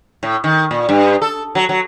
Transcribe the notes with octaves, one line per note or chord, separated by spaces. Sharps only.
A2
D#3
A#2
G2
A4
F#3
F#3